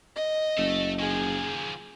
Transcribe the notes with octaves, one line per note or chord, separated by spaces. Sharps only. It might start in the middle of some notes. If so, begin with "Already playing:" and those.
D#5
F#1 A3 A4
D#3 F3 G#4